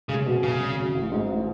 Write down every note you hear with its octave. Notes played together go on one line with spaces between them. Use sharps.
C#3 G#3
B2
F#2 C#3
G#1
F#2
A1
G#2
A1